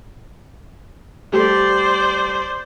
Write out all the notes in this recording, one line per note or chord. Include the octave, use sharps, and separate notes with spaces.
G3 A3 G4 C5 D5